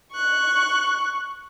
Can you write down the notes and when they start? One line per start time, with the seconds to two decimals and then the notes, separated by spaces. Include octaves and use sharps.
0.12 C#6 F#6